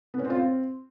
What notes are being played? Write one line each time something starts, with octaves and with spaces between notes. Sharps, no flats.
B3
C#4
C4
F4
C4